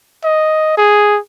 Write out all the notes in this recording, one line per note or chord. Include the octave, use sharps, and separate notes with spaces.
D#5
G#4